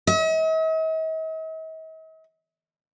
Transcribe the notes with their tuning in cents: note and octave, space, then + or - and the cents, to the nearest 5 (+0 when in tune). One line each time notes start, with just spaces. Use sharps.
D#5 +45